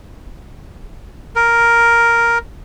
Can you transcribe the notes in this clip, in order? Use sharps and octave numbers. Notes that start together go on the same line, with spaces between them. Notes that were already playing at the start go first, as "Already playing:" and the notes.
A#4